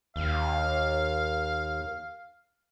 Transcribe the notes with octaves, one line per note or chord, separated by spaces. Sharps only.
D#2 F5